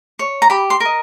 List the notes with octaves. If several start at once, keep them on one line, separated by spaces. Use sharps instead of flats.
C#5
A#5
G4 B5
C6
A#4 D#5